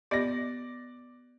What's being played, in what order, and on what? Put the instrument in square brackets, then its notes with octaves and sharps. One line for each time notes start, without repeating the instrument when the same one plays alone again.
[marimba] B3 G4 D#5 [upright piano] D5 A#6